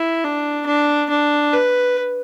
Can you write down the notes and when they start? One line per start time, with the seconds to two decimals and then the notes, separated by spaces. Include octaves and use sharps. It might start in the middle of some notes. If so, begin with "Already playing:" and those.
Already playing: E4
0.24 D4
0.67 D4
1.10 D4
1.53 B4